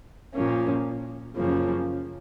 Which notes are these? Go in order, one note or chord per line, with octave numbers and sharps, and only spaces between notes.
A#2 F3 A#3 C#4
F#2 C#3 F3 A#3 C#4